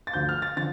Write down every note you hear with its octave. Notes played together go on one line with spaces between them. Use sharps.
A6
D2 D3 F3 G6
F6
A6
D3 F3 A6